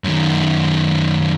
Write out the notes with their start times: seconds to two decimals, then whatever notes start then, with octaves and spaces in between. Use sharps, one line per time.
0.04 F#2 D#3